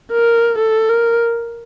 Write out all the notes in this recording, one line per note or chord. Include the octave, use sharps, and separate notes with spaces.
A#4
A4
A#4